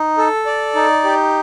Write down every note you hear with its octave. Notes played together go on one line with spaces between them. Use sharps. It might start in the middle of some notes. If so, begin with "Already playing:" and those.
Already playing: D#4
A4
D5
D#4
G4